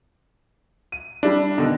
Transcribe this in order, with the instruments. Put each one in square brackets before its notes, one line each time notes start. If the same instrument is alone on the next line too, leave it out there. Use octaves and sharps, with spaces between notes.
[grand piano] D#7
[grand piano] G3 E4 [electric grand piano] D4
[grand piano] B2 D3 D#3